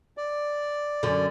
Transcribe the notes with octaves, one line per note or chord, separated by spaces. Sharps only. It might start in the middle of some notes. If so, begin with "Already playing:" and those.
D5
F#2 D3